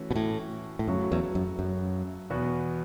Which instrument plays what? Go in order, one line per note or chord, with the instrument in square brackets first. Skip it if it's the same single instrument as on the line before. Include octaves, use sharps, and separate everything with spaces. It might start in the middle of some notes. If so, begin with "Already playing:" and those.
Already playing: [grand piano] E3 A3 C#4 F#4
[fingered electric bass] B2
A2
A2
[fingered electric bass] F#2 [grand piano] C#3 F#3 A3 F#4
[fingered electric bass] E2
F#2
F#2
[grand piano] E2 B2 B3 F#4